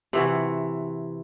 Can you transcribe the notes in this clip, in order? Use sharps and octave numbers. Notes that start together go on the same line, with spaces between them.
C3 E3 F#4